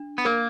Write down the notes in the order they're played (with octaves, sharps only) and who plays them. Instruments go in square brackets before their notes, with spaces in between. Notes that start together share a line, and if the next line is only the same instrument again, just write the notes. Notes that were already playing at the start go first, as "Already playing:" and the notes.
Already playing: [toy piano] D4
[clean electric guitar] B3
[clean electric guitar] A#3 [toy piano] A#4